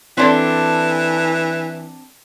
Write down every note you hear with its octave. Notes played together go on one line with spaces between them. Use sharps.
E3 C4 D4 A4